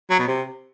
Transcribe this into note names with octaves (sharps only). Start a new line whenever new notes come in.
F#3
B2
C3